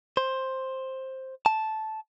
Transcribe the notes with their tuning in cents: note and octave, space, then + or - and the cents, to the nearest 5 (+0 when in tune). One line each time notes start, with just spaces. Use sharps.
C5 +10
A5 -10